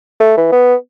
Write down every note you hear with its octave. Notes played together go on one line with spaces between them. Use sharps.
A3
E3
B3